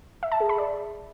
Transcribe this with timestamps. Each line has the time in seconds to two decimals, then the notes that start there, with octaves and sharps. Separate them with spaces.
0.23 E5
0.32 A5
0.40 G#4
0.49 B5
0.58 D5